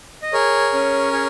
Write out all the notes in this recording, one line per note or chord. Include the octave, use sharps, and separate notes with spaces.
D#5
G#4 A#4 C#5
C#4
G#4